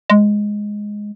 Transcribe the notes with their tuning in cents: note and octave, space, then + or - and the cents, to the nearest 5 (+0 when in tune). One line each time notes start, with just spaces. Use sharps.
G#3 +0